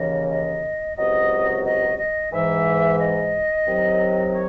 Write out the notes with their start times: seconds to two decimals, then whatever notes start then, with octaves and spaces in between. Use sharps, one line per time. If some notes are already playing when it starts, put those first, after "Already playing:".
Already playing: D#2 C#3 E3 D#5
0.29 D#5
0.97 C#2 C3 F#3 D#5
1.64 D#5
1.98 D#5
2.32 G#2 E3 E5
2.99 D#5
3.66 C2 C3 D#3 F#3
4.34 C#5